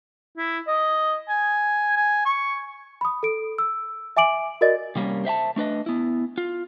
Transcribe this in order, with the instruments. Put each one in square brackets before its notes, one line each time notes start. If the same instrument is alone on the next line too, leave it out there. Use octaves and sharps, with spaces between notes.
[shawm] E4
D#5
G#5
G#5
C#6
[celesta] B5 D#6
A4 D7
E6
E5 G#5 D6 D7 F#7
F#4 A#4 D5 D#5 A6
[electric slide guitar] C3 G3 A#3 B3 C#4
C5 E5 F#5 A5
A3 D4 B4 D#5
B3 E4
F4